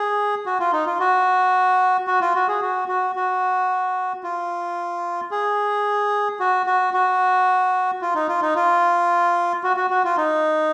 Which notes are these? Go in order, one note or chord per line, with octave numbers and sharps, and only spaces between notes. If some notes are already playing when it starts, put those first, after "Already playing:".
Already playing: G#4
F#4
F4
D#4
F4
F#4
F#4
F4
F#4
G#4
F#4
F#4
F#4
F4
G#4
F#4
F#4
F#4
F4
D#4
F4
D#4
F4
F#4
F#4
F#4
F4
D#4